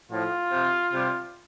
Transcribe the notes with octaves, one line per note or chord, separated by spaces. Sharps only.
A2 F3 F4
C3 F3
C3 G3